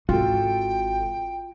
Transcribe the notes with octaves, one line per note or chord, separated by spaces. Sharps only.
G#1 F4 F#4 A4 G5